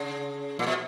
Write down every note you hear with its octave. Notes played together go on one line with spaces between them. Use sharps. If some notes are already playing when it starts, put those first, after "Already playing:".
Already playing: C#3
A#2
B2